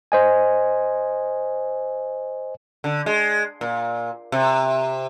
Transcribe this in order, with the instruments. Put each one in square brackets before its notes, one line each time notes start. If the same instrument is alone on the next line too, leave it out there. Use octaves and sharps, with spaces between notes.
[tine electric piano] C5 D#5 G#5
[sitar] D3
G#3
A#2
C3